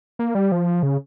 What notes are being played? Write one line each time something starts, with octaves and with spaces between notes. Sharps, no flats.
A#3
G3
F3
C#3